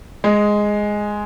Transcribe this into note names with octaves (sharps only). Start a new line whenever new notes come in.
G#3